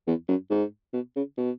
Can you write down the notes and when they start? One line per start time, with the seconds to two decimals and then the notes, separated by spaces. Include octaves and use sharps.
0.07 E2
0.29 F#2
0.50 G#2
0.93 B2
1.16 C#3
1.37 B2